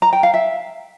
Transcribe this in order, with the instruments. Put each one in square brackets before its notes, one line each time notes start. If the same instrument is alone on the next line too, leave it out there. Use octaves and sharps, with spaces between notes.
[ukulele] A#5
G5
F5
E5